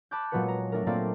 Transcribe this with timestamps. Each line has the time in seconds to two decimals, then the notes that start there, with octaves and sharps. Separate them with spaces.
0.11 A5 B5 D6 F#6 G6
0.31 A#2 F#3 G#3 B3 B4 C#7
0.48 A#5
0.72 A3 D4 A#4
0.86 A#2 A3 A#3 C4 D5 C7